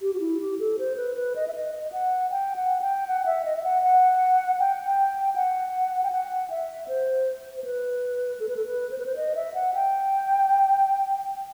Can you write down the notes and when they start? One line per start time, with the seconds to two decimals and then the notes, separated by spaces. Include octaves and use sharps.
0.02 G4
0.14 F#4
0.20 E4
0.41 G4
0.59 A4
0.79 C5
0.97 B4
1.16 B4
1.36 D#5
1.48 E5
1.54 D#5
1.92 F#5
2.31 G5
2.56 F#5
2.81 G5
3.07 F#5
3.26 E5
3.45 D#5
3.56 E5
3.64 F#5
3.83 F#5
4.60 G5
4.84 G5
5.35 F#5
6.04 G5
6.12 F#5
6.50 E5
6.88 C5
7.57 C5
7.64 B4
8.40 A4
8.49 B4
8.57 A4
8.66 B4
8.91 C5
8.99 B4
9.06 C5
9.16 D#5
9.35 E5
9.54 F#5
9.74 G5